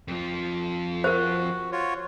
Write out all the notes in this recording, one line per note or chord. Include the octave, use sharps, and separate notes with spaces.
F2 F3
F#4 A#4 C5
F4 F#4 C#5